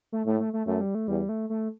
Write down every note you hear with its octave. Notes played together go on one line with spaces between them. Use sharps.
A3
A2 A3
A3
A3
F#2 A3
G3
A3
E2 G3
A3
A3